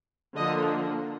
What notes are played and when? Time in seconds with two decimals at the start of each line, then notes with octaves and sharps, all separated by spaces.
0.37 D3 F3 A#3 D#5